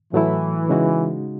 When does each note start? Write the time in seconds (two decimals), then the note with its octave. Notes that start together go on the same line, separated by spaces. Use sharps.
0.13 A2 E3 F#3 A3 E4
0.69 C#3 G#3 D#4 F#4